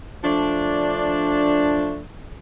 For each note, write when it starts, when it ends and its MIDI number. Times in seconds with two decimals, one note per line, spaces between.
0.24 2.02 53
0.24 2.02 57
0.24 2.02 62